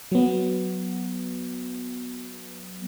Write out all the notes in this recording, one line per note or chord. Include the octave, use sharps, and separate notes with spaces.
F#3 B3